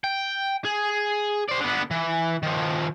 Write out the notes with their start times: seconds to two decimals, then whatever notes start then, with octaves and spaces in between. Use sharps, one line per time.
0.04 G5
0.65 G#4
1.49 C5 D5
1.60 D3 B3
1.91 E3
2.43 D#3 F3